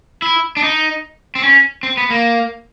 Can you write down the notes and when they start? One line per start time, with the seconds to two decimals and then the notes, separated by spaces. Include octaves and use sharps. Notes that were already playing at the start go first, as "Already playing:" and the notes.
0.22 E4
0.57 D4
0.63 D#4
1.35 C4
1.43 C#4
1.83 C4
1.97 B3
2.10 A#3